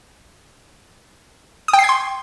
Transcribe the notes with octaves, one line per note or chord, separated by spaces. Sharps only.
D#6
G5
C7
G#6
C6